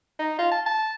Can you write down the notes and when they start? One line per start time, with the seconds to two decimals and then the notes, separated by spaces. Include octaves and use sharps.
0.19 D#4
0.39 F4
0.51 A5
0.66 A5